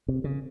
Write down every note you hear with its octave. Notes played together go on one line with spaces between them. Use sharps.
C3
C#3